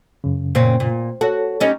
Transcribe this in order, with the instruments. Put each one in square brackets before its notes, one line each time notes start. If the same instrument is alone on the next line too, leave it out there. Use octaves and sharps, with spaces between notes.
[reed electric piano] F#2 C#3
[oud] A#2 C4 C#4
A#2
[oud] F#4 [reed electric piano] A4 C#5
[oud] G3 C#4 D#4